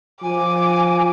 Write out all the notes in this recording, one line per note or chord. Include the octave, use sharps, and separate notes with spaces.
F3 G#5 D6